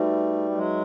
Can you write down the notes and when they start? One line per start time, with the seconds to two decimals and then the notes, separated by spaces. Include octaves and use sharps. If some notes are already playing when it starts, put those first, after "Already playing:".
Already playing: G3 A3 D#4 F#4 B4 E5
0.51 A3
0.56 F#3 G#3